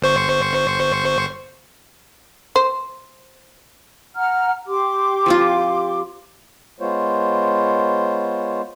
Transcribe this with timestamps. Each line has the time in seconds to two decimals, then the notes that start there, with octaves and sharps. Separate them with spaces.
0.02 G1 C5 C#6
2.56 C5
4.15 F#5 A#5 F6
4.67 G4 C6 D6
5.26 F3 C4 F4
6.80 G#3 B3 F4 C5 C#5